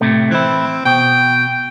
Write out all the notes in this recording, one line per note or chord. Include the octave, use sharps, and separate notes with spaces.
A2 C3 A3
E3 C4 E4
B2 G5